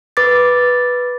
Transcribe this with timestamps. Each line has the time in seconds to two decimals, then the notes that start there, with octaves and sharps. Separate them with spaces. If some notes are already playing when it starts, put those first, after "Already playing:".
0.17 B4 D6 A6